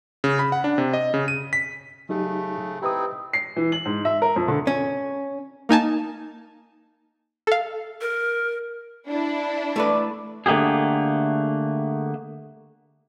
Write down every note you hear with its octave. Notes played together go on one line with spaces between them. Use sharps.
C#3
B5
F#5
D4
C3
D#5
C#3
D#7
B6
C#3 F#3 A3 D#4 G4
C4 D#4 E4 G4 B4 D#6
C7
E3
F#7
G#2
E5
A#4
F2
D3
C#4
A#3 D#4 G#5 A5
A4 F5
A#4
D4 E4
A3 A4 B4 D5
D3 A3 A#3 G4 G#4